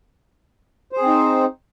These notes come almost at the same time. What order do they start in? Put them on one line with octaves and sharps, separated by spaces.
C5 G#4 C4 D#4